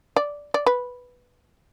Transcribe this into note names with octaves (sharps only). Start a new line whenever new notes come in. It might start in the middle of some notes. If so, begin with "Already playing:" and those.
D5
D5
B4